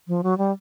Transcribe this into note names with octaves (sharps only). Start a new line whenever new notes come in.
F3
F#3
G3